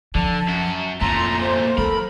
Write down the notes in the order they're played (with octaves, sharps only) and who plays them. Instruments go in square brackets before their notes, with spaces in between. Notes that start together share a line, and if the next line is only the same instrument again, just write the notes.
[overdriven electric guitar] D3 [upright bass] F3 [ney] A5
[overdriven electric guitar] F#2 F#4
[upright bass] F2 [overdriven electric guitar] A#2 A3 [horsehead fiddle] A#5 [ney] C6
[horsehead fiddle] A#3 C5
[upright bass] F#3 [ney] A4 [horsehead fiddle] A#4 [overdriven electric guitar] B5